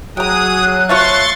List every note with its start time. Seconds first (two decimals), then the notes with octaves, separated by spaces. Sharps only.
0.17 F#3 G#4 G5 A#5 D#6 F#6
0.89 A3 F4 C#5 C6 C#6 A6